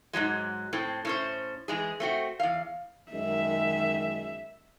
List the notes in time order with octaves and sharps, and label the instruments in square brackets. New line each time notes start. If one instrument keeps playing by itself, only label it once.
[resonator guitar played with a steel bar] G#2 C#3 F#3 G#3
A2 C4
A2 C#4 C5
E3 G#3 G#4
A3 C4 F#4
E2 F5
[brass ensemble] F#2 D#3 G#3 [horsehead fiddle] E5